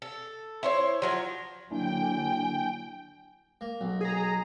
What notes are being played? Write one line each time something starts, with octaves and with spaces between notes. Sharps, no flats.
A4
E4 C5 C#5
F3 F#3 C#5
D3 F#3 A#3 D4 E4 G5 G#5
A#3
B1
G#4 A#5